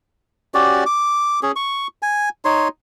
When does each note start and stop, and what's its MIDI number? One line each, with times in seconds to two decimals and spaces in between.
0.54 0.84 61
0.54 0.84 66
0.54 0.84 67
0.54 0.84 74
0.86 1.40 86
1.43 1.52 61
1.43 1.52 68
1.56 1.87 85
2.02 2.29 80
2.45 2.68 63
2.45 2.68 73
2.45 2.68 84